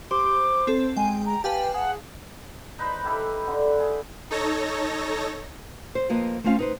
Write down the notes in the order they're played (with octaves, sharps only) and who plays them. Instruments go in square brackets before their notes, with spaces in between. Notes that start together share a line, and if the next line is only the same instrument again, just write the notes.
[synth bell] G4 [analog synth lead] C5 [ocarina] D6
[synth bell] C4 A4
[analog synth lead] G#3 [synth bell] G5 [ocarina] G#5
[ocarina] A#5
[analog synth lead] G4 [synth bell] B4 F5 A5 [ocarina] G#5
[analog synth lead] G#4 [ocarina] F#5
[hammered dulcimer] D#4 B4 C5 B5
D#4 E4 G4 A4
D3
G#4
[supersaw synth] D#4 A4 C#5 A#6
[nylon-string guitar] C5
F2 F3 A#3 B4 D#5
A3 C4 C#4 F4 F5
D#4 B4 C5